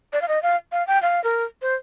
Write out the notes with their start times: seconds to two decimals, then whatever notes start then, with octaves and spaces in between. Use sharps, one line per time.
0.13 D5
0.22 F5
0.28 D#5
0.43 F5
0.72 F5
0.87 G5
1.02 F5
1.24 A#4
1.62 C5